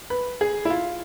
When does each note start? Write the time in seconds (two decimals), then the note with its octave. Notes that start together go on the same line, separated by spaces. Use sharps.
0.10 B4
0.41 G#4
0.65 E4
0.70 F4